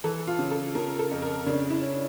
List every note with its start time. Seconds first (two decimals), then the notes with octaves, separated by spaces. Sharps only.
0.04 E3 A4
0.27 F4
0.39 C#3
0.51 A4
0.75 C#3 A#4
0.99 A4
1.11 F2
1.22 A#4
1.46 C#3 D4
1.70 E4
1.82 C#4